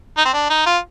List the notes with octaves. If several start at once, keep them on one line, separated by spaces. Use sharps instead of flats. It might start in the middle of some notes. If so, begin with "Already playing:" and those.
D#4
C4
D4
D#4
F4